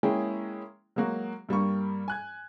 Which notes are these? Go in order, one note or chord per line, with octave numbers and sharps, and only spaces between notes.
G#3 A#3 C#4 E4 G#4 G5
F#3 G#3 A#3 F#4
G2 G3 A#3 C#6
G#5 F#6 G#6